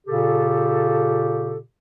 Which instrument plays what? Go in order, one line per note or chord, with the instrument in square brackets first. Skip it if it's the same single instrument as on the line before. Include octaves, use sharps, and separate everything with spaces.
[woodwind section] A#2 C#3 G4 A4